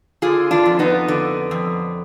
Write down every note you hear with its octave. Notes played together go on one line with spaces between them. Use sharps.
D3 F4 G#4
D4 F4
F2
B3 D#4
D3
F2